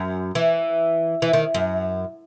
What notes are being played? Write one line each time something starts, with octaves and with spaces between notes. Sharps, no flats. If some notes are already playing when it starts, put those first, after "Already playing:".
Already playing: F#2
E3
E3
D#3
F#2